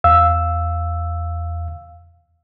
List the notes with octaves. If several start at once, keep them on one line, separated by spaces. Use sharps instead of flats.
E2 F5 E6